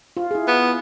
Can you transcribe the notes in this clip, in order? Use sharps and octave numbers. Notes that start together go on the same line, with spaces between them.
F4
E4 G#4
B3